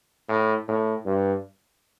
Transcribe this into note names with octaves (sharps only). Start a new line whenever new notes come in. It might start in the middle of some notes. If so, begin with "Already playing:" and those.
A2
A2
G2